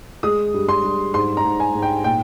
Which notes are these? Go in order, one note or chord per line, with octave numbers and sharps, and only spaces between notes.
G#3 D#6
G2
C6
G2
G#2 C6
A#5
G#2
G#5
G#2
G5
A#2 G5